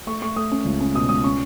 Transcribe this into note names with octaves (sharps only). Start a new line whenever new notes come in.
A3 C#6
A3 C#6
A3 D#6
C#4
C#2
C#4
B2 D#6
C#2 D#6
C#4 C#6